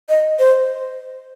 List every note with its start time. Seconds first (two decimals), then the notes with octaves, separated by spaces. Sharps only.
0.09 D#5
0.39 C5